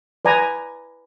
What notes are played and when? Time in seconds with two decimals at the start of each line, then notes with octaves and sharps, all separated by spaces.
0.25 B4 D5 G#5 A#5